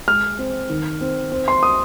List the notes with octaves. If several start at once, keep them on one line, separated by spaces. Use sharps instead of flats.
G#3 F6
C4
D#3
C4
C4
C6
D#6